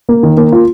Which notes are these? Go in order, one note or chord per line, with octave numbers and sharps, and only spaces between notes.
A#3
D#3
A#3
F4